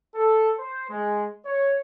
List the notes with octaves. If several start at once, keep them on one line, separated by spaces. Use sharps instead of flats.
A4
C5
G#3
C#5